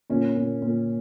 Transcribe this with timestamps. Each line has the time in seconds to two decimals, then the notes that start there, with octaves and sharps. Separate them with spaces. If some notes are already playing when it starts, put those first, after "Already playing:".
0.10 A#2 C#4
0.36 A#2
0.62 A#2